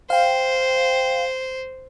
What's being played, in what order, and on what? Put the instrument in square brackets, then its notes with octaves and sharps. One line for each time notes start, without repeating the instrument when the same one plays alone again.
[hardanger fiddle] C5 [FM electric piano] F5 G5